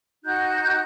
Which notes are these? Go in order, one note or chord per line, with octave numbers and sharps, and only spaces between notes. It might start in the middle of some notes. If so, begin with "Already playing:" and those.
D#4 F#4 F#6 G6